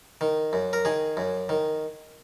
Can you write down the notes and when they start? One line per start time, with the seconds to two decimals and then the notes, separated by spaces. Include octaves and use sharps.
0.21 D#3
0.53 F#2
0.73 A#4
0.85 D#3 G#4
1.17 F#2
1.49 D#3